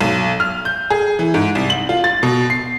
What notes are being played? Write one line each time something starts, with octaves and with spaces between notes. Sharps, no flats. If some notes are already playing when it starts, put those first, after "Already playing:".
B1
F6
G6
G#4
E3
G#2
C2
F#7
F4
A6
B2
C7